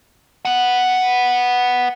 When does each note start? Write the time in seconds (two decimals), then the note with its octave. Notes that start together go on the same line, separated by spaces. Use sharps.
0.45 B4 F#5